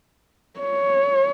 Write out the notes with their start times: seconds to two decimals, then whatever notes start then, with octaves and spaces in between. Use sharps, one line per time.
0.60 C#5